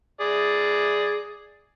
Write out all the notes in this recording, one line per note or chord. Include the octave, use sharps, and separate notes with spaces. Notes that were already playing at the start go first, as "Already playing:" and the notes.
G#4 D5